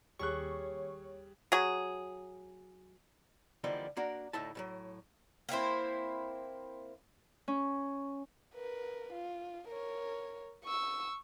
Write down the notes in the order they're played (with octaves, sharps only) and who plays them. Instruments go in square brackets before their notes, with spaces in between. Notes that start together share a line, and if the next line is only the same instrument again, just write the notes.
[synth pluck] D#2 C#6 [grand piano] G3 G#4 F#6 [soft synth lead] C#5
[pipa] F#3 G#4
[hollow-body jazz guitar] D3 E3 F3 G3 A#3 D#4
A#3 D4 F#4 A#4
D2 A2 D#4 E4 A5
A2 E3 F#3
[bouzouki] A#3 C4 E4 C5
[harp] C#4
[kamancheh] A#4 B4
F4
A#4 C#5
C#6 E6